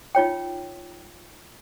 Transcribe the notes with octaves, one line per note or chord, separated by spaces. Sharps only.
D#4 F4 C#5 G5